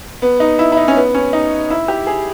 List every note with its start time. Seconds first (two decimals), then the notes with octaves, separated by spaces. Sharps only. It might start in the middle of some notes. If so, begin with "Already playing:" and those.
0.22 B3
0.40 D#4
0.59 E4
0.72 E4
0.77 D#4
0.88 C#4
0.96 B3
1.15 C#4
1.33 D#4
1.70 E4
1.88 G4
2.07 G#4